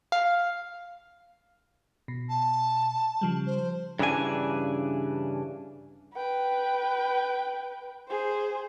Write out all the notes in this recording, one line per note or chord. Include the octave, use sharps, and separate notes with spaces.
F5
B2
A5
C#3 F3 G3
C5
G2 C#3 E3 D4 G#5
B4 G5
G#4 C5